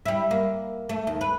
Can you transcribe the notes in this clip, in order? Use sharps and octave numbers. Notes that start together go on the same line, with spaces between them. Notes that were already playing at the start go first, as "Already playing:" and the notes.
G3 E4
A#3
A3
D#2
B4